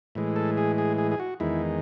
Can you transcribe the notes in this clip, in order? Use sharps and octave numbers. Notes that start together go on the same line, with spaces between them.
A2 E3 G#3
A4
G#4
G#4
G#4
G#4
F#4
E2 D#3 G#3 E4